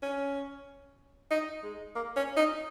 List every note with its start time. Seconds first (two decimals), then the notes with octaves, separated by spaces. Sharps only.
0.03 C#4
1.31 D#4
1.63 G#3
1.96 A#3
2.16 C#4
2.37 D#4